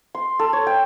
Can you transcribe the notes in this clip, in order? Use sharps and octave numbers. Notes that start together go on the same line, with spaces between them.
C6
A4
C#5
G5